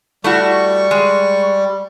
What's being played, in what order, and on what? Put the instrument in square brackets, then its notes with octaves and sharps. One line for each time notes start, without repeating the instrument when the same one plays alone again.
[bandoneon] G3 [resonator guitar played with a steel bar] A3 E4 F#4 [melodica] C#6
[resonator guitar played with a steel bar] G#3